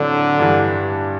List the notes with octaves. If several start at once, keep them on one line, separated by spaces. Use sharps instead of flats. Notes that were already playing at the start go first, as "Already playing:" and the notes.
Already playing: A2 D3 F#3 C4
G2 E3 G3